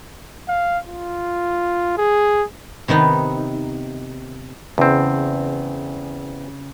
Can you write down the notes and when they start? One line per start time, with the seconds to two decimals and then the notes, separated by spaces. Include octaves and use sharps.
0.49 F5
0.87 F4
1.97 G#4
2.88 C3 D#3 B3 D#4
4.78 E2 C#3 C4